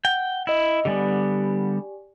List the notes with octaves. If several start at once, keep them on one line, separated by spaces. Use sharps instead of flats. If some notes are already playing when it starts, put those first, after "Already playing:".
F#5 G5
E4 D#5 E6
D3 G3 B3 G4 D5 G#5